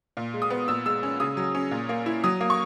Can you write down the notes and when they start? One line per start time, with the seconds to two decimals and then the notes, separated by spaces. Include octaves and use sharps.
0.17 A#2
0.34 G#3
0.42 D#6
0.50 B3
0.68 A#2 E6
0.85 G#3 E6
1.03 C#4
1.20 C#3 D#6
1.37 F#3
1.55 C#4
1.71 A#2
1.89 A#3
2.06 E4
2.24 F#3 D#6
2.40 A#3
2.50 C#6